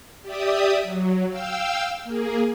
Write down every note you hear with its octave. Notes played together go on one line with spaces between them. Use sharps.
G4 D5 E5 D#6
F#3
F5 G5 E6
A#3 G#4